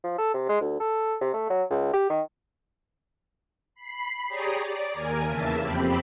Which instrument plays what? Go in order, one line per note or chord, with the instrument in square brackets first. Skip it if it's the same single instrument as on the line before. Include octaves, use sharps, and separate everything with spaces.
[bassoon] F3
A4
C3
G#3
D2
A4
C3
A3
F#3
C#2
G4
D#3
[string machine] B5 C7
G4 G#4 C#5 D5 A#5 D#6
D5
D#2 A#4 G#5
E2 C#3 A#3 E5 A5
F2 C4 G4 B5